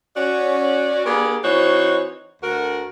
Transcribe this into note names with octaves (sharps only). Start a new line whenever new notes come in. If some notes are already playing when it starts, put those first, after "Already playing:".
C#4 F#4 D5
A#3 B3 D4 G4 G#4 A#4
E3 C4 D#4 F#4 C5 C#5
D2 F#4 A#4